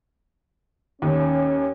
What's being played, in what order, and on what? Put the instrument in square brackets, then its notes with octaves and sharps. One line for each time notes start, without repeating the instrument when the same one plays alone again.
[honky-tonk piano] D#2 [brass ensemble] C#4